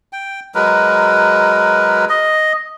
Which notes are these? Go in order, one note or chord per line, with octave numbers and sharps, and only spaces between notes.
G5
F#3 G#3 A#4 B4
D#5